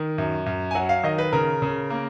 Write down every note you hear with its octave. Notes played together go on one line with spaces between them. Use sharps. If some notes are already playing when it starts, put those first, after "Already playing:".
Already playing: D#3
F#2
F#2
G#5
F#3 F#5
F5
D#3 D#5
B4
C#3 A#4
C#3
A#3